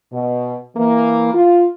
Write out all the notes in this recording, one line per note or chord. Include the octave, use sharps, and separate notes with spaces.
B2
E3 A#3
F4